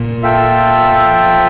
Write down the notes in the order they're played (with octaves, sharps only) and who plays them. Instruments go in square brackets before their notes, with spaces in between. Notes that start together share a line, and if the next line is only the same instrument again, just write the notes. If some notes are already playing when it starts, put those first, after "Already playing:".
Already playing: [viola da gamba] A#2
[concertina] F4 A4 E5 G5
[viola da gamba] F3